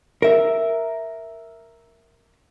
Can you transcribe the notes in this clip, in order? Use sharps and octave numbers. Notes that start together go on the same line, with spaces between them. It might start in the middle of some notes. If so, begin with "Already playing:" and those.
A#4 E5